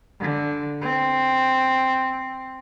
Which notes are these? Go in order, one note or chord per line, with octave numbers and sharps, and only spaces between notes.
D3
C4